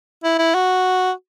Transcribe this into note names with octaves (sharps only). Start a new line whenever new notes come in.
E4
E4
F#4